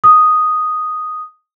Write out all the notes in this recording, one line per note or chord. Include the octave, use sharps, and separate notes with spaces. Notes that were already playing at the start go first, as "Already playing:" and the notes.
D#6